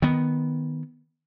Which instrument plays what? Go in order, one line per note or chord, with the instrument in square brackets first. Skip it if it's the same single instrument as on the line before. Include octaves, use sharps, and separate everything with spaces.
[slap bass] D#3 B3